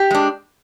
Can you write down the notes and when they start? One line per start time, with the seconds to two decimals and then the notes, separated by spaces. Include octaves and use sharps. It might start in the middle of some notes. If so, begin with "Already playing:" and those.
Already playing: G4
0.11 G#3 D4